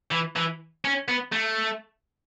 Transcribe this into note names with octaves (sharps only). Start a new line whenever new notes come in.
E3
E3
C#4
B3
A3